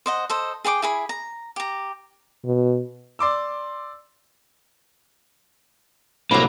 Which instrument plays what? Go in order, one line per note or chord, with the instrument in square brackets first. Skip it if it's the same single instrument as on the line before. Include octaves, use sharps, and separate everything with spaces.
[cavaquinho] C5 D#5 F#5
A4 C5 D#5
G#4 G5 C6 D6
E4 G#4 B5
A#5
G4 A#5
[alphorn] B2
[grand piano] D5 C6 D6 E6
[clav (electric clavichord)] C2 A2 D3 [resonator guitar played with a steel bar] F#3 D4 [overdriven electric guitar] A#3 [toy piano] B5